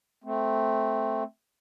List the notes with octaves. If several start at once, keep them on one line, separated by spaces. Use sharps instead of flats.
A3 C4